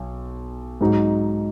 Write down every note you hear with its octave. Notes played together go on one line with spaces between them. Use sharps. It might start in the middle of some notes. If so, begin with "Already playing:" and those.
Already playing: B1
G#2 F#3 D#4